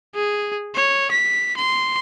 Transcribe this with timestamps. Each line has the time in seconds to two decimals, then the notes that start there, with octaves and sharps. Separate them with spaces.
0.15 G#4
0.75 C#5
1.11 B6
1.57 C6